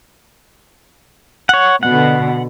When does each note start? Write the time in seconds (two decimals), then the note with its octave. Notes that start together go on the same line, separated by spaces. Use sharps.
1.49 C#5 F#5
1.83 B2 D3 F#5